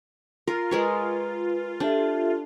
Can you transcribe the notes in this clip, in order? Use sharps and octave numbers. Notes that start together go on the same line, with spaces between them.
F4 A#4
G#3 A#4 B4 C#5
D4 G4 A4 E5